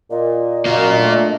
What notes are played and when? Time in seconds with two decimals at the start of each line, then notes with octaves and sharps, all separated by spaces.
0.11 A#2 D#5
0.65 F#2 A#3 F4 F#4 A#4
0.96 A3 D4